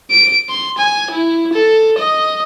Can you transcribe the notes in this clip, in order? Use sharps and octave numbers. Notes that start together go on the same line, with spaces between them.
D7
C6
G#5
E4
A4
D#5